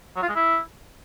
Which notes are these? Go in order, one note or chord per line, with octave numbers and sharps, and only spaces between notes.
F#3
F4
G#3
E4